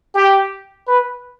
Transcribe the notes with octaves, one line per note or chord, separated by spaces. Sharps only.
G4
B4